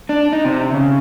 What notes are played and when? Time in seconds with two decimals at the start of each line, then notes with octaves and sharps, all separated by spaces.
0.09 D4
0.33 D#4
0.45 C3
0.74 C#3